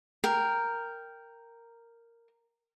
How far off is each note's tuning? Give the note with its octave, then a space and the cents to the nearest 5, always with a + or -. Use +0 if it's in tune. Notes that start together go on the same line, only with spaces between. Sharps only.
A#4 -5 G5 +0